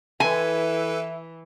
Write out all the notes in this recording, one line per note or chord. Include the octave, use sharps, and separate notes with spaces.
E3 E4 A4 B4 G#5